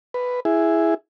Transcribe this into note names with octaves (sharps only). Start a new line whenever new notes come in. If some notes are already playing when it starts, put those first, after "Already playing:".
B4
E4 G#4